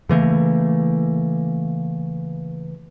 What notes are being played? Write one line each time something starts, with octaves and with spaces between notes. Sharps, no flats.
C#3 E3 A3 A#3